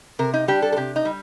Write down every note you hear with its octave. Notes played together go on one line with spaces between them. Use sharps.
C3 A#4
D#4
G3 D4 G4
A4
A4
C3 G4
D#4
G3